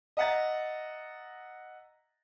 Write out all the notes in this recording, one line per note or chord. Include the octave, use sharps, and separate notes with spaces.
D#5 E5 F#5 A#5 A6